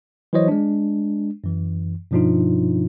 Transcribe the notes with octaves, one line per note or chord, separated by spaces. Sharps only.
E3 F#3 E4 C5 C#5 D#5
G#3 D4
F#2 E3
G2 B2 F3 D4 D#4 F4